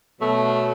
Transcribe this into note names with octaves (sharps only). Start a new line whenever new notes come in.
B2 F#3 A3